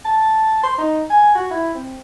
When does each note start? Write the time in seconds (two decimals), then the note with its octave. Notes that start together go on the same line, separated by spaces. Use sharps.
0.05 A5
0.64 C6
0.78 D#4
1.10 G#5
1.35 F#4
1.51 E4
1.74 C4